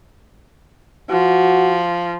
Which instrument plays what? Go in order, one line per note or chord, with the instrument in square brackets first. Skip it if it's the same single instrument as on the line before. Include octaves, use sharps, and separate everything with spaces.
[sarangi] F3 [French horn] F#4